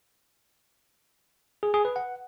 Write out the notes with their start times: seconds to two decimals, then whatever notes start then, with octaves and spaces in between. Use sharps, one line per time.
1.63 G#4
1.74 G#4
1.85 B4
1.96 F#5